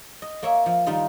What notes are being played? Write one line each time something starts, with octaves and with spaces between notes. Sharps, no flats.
D#5
A#3 C#5 E5
F3
D#3 G3 D#4 F4